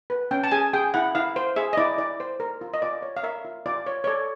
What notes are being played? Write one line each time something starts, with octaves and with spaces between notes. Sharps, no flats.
B4
C#4 G5
A5
G#4 G#5
G#4 G5
E4 F#5
E4 F5
C5
G#4 E5
D#5
E4 D5
E4 D5
C5
A#4
F4
D#5
F4 D5
C#5
F5
A#4 E5
F4
F4 D5
C#5
C#5
A4 D5